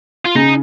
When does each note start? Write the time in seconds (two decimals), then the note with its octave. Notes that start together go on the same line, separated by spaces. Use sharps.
0.25 F4
0.35 C#3 D#4